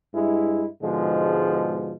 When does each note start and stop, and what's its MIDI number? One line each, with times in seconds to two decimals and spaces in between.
0.14 0.65 43
0.14 0.65 56
0.14 0.65 64
0.82 1.92 44
0.82 1.92 47
0.82 1.92 50
0.82 1.92 53
0.82 1.92 56